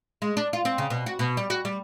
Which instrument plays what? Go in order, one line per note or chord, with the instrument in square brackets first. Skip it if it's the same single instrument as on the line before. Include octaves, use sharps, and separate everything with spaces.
[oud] G#3
D4
F4
C4
C#3
B2
F#4
B2
G3
F#4
G3